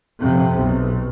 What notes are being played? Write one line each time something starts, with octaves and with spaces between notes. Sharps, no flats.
F2 C3
B1